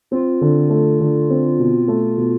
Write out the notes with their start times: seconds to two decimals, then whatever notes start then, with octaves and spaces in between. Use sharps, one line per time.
0.11 C4 F4
0.41 D3
0.70 A3
1.00 D3
1.30 C4
1.59 B2
1.88 A3
2.18 B2